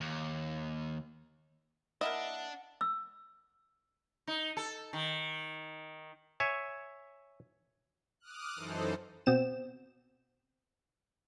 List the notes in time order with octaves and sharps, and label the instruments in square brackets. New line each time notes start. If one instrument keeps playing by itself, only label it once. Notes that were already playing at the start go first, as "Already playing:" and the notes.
[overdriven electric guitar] D#2
[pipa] A#3 E4 E5 [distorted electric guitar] D4 [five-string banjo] D#5 [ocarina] F#5
[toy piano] E6
[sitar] D#4
A4
D#3
[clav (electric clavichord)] C#5 E5 G#5
[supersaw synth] D6 D#6 F6 F#6
F#2 E3 D#4 A4 C5
[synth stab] B2 C4 E7